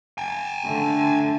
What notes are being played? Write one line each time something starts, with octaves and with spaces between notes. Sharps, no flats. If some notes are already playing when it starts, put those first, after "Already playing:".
G5 G#5
D3 A3